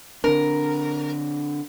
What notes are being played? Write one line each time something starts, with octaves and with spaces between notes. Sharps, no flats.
D3 C4 D4 A#4